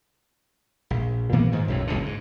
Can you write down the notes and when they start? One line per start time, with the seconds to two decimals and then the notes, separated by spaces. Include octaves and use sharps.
0.90 A#1
1.32 A#2 E3 A#3 B3
1.52 G#2 D#3
1.68 B1 F#2 A2
1.87 F#1 C#2 A#2 D3
2.05 G#2